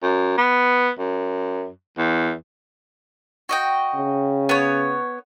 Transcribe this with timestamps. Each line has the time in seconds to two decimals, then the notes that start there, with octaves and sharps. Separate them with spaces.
0.03 F#2
0.38 B3
0.98 F#2
1.98 E2
3.49 F#4 D#5 G5
3.95 C#3
4.49 B3 C#5